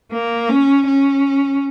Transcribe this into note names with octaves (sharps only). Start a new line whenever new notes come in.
A#3
C#4
C#4